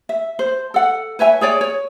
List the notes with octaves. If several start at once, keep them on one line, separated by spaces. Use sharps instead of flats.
E5
C5
A4 F#5
B4 C#5 E5 G#5
G#4 C#5 D5 G#5
C#5